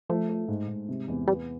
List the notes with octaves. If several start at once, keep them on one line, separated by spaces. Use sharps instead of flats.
F3 A3
A3
G#2
G#2
C3
E2
G3 B3